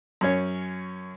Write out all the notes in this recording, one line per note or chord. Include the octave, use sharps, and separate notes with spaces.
F#2 C#4 C#5